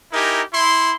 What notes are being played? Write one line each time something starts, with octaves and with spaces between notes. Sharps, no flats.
D#4 E4 G4 A#4 G#5
E4 C6